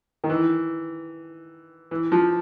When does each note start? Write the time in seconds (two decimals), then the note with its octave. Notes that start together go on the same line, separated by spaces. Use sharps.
0.24 D#3
0.30 E3
1.91 E3
2.12 F3